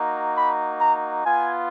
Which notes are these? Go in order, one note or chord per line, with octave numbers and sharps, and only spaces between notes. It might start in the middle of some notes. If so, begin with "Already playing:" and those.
Already playing: A#3 D#4 F#4
B5
A#5
B3 F4 G#5